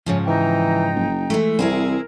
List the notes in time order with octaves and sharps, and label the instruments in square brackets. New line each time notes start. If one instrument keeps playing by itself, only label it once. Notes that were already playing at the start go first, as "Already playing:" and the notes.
[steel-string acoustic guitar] G#2 C#3 F3 [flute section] C#5 G#5
[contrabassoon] E3 [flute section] D#4 G5 A#5
[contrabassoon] F#1
[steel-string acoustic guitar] E3 G#3 A3
[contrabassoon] C2 [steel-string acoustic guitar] C4 E4 G#4 [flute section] A#4